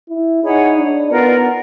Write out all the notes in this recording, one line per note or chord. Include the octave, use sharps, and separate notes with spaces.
E4
D#4 G#4 C#5 F#5 B5
D4
B3 F4 A#4 D5 F#5